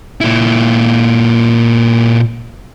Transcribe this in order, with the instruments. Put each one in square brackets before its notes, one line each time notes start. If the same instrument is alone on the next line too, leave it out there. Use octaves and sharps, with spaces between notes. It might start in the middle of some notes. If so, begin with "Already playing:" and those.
[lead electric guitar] A#2 E4